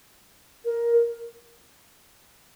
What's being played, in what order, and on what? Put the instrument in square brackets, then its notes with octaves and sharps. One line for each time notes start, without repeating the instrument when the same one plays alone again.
[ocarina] A#4